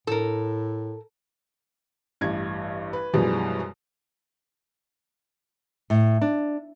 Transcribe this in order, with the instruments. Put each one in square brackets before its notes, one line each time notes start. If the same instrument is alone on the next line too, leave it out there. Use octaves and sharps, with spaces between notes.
[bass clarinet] A2 [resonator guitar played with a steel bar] A4 A#4
[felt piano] A1 G2 G#6
B4
F#2 B2 E3 F3 G3 G#3
[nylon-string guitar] A2
D4